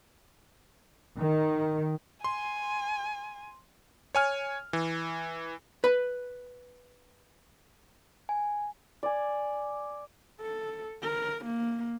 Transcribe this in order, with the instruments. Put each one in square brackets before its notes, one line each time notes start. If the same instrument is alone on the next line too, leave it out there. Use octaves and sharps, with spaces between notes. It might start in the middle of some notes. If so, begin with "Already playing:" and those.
[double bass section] D#3
[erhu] G#5 [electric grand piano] C6
[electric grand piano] C#5 G#5 F6
E3
[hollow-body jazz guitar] B4 B5
[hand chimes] G#5
[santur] D5 G#5
[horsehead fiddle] A4
A#4
A#3